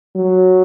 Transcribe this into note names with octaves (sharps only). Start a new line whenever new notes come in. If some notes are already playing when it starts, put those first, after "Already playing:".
F#3